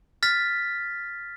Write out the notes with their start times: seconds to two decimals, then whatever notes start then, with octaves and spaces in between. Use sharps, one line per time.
0.23 F6 A6 B6